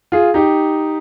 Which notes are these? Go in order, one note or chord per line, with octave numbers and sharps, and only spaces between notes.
F4 G#4
D#4 G4